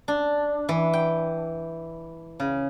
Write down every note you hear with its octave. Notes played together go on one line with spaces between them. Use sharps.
D4
E3
G5
C#3